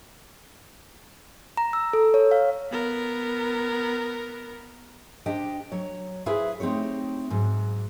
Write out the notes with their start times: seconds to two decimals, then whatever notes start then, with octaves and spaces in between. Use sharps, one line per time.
1.57 A#5
1.73 E6
1.93 A4
2.14 C#5
2.31 F5
2.71 B3 A#4
5.26 D4 G4 C5 D#5 G5
5.72 F#3 C#5
6.26 E4 G#4 B4 C5 E5 F5
6.60 A3 C4 D#4 G4 C#5
7.30 G#2 F#3